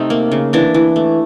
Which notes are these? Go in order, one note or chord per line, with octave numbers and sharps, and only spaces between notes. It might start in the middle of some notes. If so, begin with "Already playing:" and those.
Already playing: C3 A3 D#4
A#3
C#3
E3 D4
E3
A3